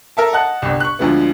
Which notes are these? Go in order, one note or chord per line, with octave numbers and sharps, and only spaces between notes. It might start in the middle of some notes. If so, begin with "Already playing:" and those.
A4 A#4 E5 A5
D#5 F#5 A5 F#6
G1 C2
C#6 F#6
D2 D3 F3 G#3 B3